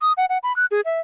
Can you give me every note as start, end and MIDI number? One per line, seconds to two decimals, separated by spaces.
0.02 0.13 87
0.17 0.25 78
0.29 0.38 78
0.43 0.55 83
0.56 0.66 90
0.71 0.81 68
0.85 1.00 76